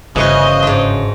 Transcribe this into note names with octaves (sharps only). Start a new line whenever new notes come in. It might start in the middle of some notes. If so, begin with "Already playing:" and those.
G1 C#3 E3 C#4 F#4 C5 D#5
G#2 D4